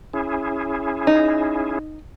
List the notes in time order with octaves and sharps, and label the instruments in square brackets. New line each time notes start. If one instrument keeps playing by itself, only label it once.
[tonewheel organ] C#4 E4 G#4
[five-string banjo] D#4